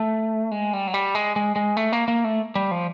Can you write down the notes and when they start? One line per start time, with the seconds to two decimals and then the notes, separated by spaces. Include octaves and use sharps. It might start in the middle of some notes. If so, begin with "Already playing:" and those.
Already playing: A3
0.51 G#3
0.73 G3
0.87 F#3
0.94 G3
1.15 G#3
1.36 G#3
1.56 G#3
1.77 A3
1.92 A#3
2.08 A#3
2.24 A3
2.55 G3
2.71 F3